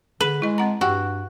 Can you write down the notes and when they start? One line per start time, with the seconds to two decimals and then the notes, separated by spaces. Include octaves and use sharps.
0.21 D3 G#4 B4
0.42 G#3 E4 D#5
0.58 C4 F#5 A#5
0.81 G2 F#4 G4 F#5 G5